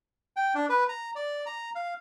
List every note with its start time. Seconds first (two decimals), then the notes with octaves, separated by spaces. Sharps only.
0.36 G5
0.55 D4
0.69 B4
0.89 A#5
1.15 D5
1.46 A#5
1.75 F5